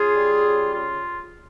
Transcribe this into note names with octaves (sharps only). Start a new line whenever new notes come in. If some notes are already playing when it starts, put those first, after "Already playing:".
Already playing: C#3 F4 G#4
G3
C#3
C#3 F4